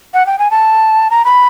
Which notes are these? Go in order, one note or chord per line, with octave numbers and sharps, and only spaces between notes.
F#5
G5
G#5
A5
A#5
B5